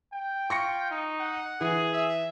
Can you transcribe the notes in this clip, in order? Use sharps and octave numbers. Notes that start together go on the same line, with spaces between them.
G5
F4 C#6 A#6 C#7
D#4
F#5
E3 G#4
E5